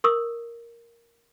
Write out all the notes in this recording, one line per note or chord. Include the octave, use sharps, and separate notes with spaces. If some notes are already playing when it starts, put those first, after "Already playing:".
A#4 C#6 D#6 E6